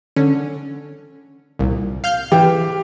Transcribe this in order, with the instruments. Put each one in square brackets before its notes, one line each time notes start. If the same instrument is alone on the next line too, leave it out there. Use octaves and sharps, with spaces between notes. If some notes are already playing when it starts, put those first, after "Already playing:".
[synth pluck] D3 C#4
C2 A#2
F5 F6 G6
[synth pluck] E3 [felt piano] G4